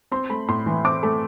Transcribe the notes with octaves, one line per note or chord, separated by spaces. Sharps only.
C4 C6
A3 B5
A2 C6
E3
C4 D6
A3